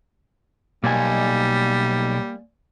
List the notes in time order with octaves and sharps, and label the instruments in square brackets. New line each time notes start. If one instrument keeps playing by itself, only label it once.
[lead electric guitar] B1 [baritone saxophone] G3 [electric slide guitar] A#3 D5 G#5